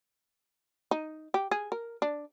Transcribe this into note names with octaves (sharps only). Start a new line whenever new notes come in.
D#4
G4
G#4
A#4
D4